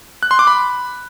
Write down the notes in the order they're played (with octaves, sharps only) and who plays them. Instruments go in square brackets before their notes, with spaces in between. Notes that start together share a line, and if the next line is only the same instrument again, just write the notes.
[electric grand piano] F#6
C6
D6
B5